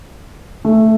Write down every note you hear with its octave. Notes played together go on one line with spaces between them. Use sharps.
A3